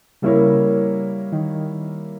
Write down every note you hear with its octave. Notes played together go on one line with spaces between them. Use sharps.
C#3 G3 A#3 E4 A#4 C#5
D#3